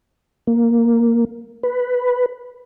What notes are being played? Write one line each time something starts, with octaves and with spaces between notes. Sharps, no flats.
A#3
B4